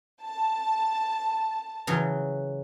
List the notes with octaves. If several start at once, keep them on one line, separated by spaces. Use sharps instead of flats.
A5
C#3 E3 F#3